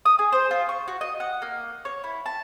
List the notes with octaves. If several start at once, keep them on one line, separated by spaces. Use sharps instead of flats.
D#6
G#4
C5
F4
C#6
F#4
D#5
F#5
A#3
C#5
E4
A5